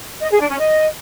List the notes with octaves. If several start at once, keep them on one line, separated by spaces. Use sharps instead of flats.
D#5
G#4
D4
C#4
D#5